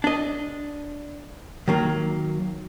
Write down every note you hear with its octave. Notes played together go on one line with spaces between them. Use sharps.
D4 D#5
D#3 F#3 A#3